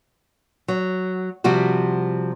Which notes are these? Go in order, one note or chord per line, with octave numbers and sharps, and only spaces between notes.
F#3
C3 F3 G3 F#4